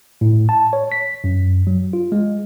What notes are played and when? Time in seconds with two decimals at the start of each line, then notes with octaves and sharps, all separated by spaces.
0.21 A2
0.49 A5
0.73 C#5
0.92 B6
1.24 F#2
1.67 F#3
1.93 F4
2.12 G#3